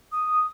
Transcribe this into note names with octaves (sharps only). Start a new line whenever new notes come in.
D#6